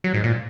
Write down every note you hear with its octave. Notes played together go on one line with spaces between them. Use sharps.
F#3
G#2
A#2